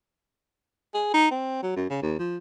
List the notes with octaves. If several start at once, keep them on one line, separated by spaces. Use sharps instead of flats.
G#4
D#4
C4
F#3
F#2
C#3
D#2
F3